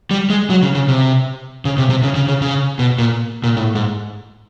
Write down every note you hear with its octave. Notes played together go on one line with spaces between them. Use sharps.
G3
G#3
F#3
C#3
C#3
C3
C#3
C3
C3
C#3
C#3
C#3
C#3
B2
A#2
A#2
A2
G#2